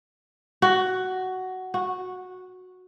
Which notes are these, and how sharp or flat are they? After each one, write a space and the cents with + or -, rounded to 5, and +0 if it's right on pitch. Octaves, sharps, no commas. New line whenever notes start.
F#4 +10
F#4 -10